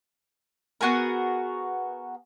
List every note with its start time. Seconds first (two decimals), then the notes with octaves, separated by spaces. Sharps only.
0.81 B3 F#4 G#4 A#4